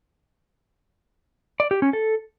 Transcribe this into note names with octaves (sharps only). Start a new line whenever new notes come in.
D5
G4
C#4
A4